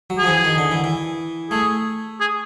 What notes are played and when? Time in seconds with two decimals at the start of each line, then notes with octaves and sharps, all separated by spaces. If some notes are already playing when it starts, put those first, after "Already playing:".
0.10 F#3
0.18 G#4
0.23 F3
0.27 E3
0.44 D#3
0.58 D3
0.71 E3
0.84 E3
1.51 A3 G#4
2.20 G#4